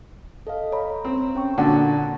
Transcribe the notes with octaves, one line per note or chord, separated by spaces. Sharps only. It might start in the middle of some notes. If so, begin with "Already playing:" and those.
A4 D#5 F5
C#5 A#5 B5
C4
C#4 G5 C#6
A#2 D3 F#4 A5 A6